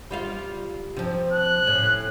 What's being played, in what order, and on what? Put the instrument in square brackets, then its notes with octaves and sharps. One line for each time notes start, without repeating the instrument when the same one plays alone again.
[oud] G3 F4 F5
C3 F3
[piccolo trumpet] F#6
[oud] A2 C#4